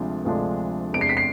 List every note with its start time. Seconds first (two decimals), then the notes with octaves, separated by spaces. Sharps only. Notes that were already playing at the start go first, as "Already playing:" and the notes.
Already playing: D2 C3 F3 G#3 D4
0.25 D2 C3 F3 G#3 D4
0.93 E2 C3 G#3 D4 D7
1.01 C7
1.09 B6
1.17 C7